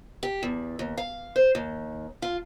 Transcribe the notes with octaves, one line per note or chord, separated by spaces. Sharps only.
G4
E2
D#2
F5
C5
D#2
F4